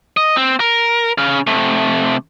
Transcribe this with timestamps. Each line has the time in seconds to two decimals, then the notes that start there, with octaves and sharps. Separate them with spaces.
0.17 D#5
0.36 C4
0.60 A#4
1.18 C#3 F5
1.47 C3 A3